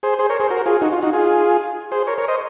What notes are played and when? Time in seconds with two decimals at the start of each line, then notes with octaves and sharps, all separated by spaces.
0.03 G#4 C5
0.19 G#4 C5
0.30 A#4 C#5
0.40 G#4 C5
0.50 F#4 A#4
0.66 F4 G#4
0.81 D#4 F#4
0.92 F4
1.03 D#4 F#4
1.13 F4 G#4
1.92 G#4 C5
2.07 A#4 C#5
2.18 A#4 C#5
2.28 C5 D#5